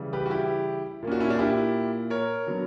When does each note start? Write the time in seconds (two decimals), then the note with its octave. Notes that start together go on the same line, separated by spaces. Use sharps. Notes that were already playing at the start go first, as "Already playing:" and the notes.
Already playing: C#3 E3 G3
0.13 G4 B4
0.26 F#4
0.30 E4 G4
1.03 A#2 A#3 C#4
1.11 D4 F#4
1.20 C#4 E4
1.29 D4 F#4
1.39 E4 G4
2.10 A#4 C#5
2.47 D3 F#3 B3